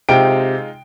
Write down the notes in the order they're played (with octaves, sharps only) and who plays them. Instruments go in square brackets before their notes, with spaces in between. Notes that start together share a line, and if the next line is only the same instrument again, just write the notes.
[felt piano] C3 D7 [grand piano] G#3 D#4 F4 [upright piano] G5